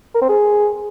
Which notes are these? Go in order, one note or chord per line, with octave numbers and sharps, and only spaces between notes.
A#4
C4
G#4